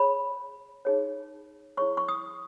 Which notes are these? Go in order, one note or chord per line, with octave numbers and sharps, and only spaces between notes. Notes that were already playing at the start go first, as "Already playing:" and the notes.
Already playing: G#4 C#5 B5
D#4 G#4 C#5
E4 G#4 C#5 C#6
C#6
D#6